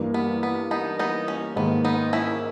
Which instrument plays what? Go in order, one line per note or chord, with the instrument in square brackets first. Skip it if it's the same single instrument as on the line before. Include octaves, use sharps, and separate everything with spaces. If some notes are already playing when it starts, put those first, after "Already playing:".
Already playing: [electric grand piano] G2 E3 A#3
[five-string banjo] B3
B3
B3 D#4
B3 D#4
C#4
[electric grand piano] G#2 D#3 A#3 [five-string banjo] B3
[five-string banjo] B3 D#4
C#4 E4